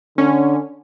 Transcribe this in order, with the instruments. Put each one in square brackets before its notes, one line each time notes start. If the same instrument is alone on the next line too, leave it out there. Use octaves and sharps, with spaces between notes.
[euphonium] D3 [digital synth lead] C#4